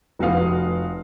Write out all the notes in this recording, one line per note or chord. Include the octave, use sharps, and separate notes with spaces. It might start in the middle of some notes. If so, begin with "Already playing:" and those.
F1 F#4 B4 F5 D#6